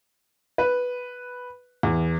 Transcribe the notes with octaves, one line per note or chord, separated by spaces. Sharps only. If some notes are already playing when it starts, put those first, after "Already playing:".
B4
E2